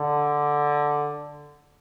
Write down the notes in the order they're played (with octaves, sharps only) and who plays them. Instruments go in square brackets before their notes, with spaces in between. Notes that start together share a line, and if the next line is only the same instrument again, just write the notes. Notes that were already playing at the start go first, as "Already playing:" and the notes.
Already playing: [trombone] D3